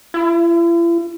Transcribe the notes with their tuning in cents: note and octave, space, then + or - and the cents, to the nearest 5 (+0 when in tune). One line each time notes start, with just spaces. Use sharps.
E4 +45